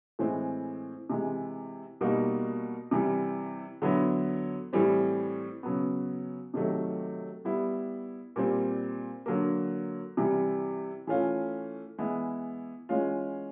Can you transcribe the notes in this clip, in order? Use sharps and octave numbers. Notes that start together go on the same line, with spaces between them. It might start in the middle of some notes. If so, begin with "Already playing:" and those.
A2 E3 G#3 C4
C3 E3 G#3
B2 G3 A#3 D#4 F#4
C3 E3 G3
D3 F#3 B3 E4
A2 E3 G3 C4
C#3 F#3 B3
C3 D#3 F#3 A3
G3 B3 E4
A#2 G3 C4
D3 F#3 A#3
C3 E3 G3
E3 A3 C#4 F4
E3 G#3 B3 E4
E3 G#3 C#4 F4